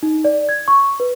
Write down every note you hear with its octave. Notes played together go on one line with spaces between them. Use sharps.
D#4
D5
G#6
C#6
B4